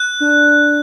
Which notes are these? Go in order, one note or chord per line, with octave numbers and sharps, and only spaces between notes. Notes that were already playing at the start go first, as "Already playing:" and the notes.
Already playing: F#6
D4